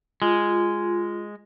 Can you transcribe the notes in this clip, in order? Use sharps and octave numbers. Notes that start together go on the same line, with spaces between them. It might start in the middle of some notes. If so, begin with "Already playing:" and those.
G#3 F4